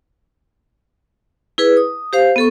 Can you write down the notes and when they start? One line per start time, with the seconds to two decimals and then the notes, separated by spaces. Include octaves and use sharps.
1.58 E4 G#4 B4
1.77 D#6
2.13 G4 C5 F5
2.36 B3 A4 C#6